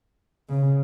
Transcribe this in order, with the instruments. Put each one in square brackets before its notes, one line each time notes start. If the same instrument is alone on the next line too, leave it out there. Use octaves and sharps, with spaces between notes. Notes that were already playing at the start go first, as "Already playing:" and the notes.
[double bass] C#3